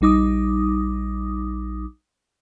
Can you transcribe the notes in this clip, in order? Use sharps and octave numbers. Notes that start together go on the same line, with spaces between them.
A#1 G3 D#4 D6 D#6